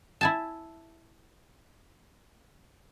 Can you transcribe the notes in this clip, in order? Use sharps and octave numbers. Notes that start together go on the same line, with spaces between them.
E4 G#5 A5